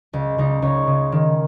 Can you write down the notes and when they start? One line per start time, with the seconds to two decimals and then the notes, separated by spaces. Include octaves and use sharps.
0.13 C#2
0.38 C#2 D#4
0.62 C#2 C#5
0.87 C#3
1.12 D#3